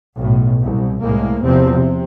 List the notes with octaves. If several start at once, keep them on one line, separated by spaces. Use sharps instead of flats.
B1 A2
C2
C2 A2 G#3 A#3
E2 C3 F3 C4
C3